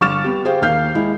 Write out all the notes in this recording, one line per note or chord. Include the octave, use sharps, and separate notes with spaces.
G1 C#6 D6 F6 A6 E7
B3 G4
G4 G#4 C5 F5 G5
D#2 A#3 F5 F6 G6 C7
G#3 E4